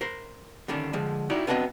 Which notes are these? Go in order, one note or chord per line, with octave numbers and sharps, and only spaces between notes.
A#4 C5
D3 D#3 G3 C#4 D4
D3 F3 G#3
D#4 E4 F#4 G4 D5
B3 C4 D4 F#4 A#4 D#5